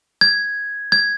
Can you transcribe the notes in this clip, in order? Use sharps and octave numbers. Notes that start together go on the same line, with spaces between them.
G#6
G#6